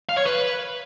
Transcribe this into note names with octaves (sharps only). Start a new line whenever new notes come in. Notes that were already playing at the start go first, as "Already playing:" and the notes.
F5
C#5
B4